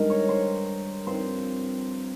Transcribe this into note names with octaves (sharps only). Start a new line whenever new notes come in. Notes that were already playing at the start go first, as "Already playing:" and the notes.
Already playing: G2 D#3 G#3 A#4
C#5
C5
G2 F3 C4 C5